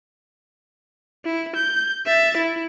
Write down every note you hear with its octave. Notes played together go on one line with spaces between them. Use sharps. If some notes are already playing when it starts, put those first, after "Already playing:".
E4
G6
E5 A6
E4